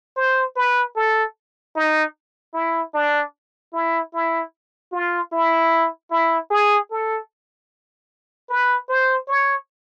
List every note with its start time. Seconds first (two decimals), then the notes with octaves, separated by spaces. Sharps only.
0.16 C5
0.56 B4
0.96 A4
1.76 D#4
2.54 E4
2.94 D4
3.73 E4
4.13 E4
4.92 F4
5.32 E4
6.11 E4
6.50 G#4
6.91 A4
8.49 B4
8.89 C5
9.28 C#5